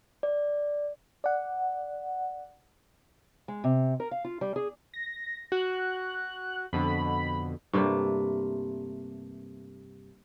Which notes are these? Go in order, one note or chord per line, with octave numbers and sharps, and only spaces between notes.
D5
D5 F#5
G#3
C3
A#4
F5
F4
G3
G#4
A#6
F#4 F#6
F2 B2 D3 B5
G2 C3 A3 A#3